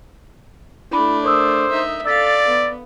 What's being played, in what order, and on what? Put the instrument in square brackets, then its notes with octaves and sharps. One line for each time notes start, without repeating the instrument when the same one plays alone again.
[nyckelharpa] A3 D4 [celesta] E4 B5
[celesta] A#4 D#6 E6 [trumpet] C5
[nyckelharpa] D#4 E5
[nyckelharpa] A4 F5 [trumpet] D5 [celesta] E6 A6 B6
[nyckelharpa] B3